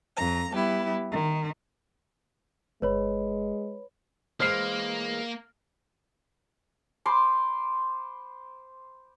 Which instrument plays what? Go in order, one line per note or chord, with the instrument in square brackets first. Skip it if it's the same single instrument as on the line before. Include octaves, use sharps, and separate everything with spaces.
[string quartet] F2 A#5
G3 B3 E4 G4
D#3
[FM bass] G1 [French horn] G#3 [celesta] B4 C#5 B5
[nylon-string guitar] E3 G#3 C5 [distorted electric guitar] A#3 [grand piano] F6 C7
[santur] C5 B5 C6 D6